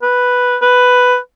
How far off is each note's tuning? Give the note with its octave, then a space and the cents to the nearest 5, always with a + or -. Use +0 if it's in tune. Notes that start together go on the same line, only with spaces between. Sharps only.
B4 +0
B4 +5